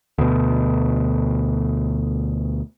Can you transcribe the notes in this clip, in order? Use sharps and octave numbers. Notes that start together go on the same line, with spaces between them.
D2 B2